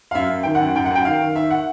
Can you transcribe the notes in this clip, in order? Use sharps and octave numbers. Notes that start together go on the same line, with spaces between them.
F5
F#2 E5
F#2
D#3 G5
F#5
F#2
F#2 G5
F#5
F#2 G5
D#3 F5
D#3
D#3 E5
F#5